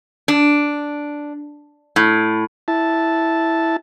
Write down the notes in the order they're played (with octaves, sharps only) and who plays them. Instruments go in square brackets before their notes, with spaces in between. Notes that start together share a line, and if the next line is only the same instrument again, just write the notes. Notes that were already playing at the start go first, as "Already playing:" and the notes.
[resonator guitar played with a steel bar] D4
A2
[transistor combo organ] E4 A5